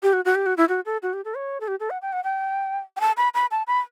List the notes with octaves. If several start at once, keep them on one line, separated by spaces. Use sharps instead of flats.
G4
F#4
F#4
G4
F#4
E4
F#4
A4
F#4
G4
A4
C#5
A4
G4
A4
F#5
G5
F#5
G5
G5
A5
B5
B5
A5
B5